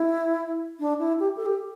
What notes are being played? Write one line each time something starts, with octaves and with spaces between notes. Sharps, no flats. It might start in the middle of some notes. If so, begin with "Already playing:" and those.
Already playing: E4
D4
E4
G4
A4
G4